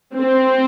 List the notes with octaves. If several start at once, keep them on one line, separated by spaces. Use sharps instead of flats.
C4